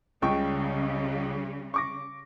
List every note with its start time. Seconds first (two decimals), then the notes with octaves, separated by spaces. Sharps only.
0.22 C#2 C#3 G3 G5 C#6
1.74 C#6 D6 A#6